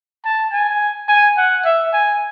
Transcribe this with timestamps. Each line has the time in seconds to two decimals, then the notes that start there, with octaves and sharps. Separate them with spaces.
0.25 A5
0.53 G#5
1.08 G#5
1.37 F#5
1.65 E5
1.93 G#5